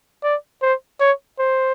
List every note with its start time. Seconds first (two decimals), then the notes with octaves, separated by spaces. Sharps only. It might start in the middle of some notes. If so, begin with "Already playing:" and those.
0.23 D5
0.62 C5
1.00 C#5
1.39 C5